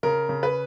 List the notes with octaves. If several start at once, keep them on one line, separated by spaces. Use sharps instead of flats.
C#3 A#4
C#3
B4